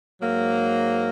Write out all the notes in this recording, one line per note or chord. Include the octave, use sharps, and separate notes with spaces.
G#2 F#3 A#3